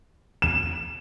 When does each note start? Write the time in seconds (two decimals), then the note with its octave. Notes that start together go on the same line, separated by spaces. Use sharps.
0.42 E7